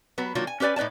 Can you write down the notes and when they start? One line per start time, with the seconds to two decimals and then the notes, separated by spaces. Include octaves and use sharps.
0.18 F#3 B3 B4
0.35 D#3 F#3 A#3 D4 F4
0.47 G#5
0.60 C#4 G4 B4 D5 G#5
0.76 A2 D#4 B4 D5 A5